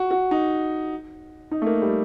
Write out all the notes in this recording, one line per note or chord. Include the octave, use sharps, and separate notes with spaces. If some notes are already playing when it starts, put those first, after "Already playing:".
Already playing: F#4
F#4
D#4
D#4
A3
A#3
G3